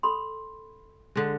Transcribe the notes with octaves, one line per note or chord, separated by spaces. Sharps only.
A4 B5 C6
D3 G#3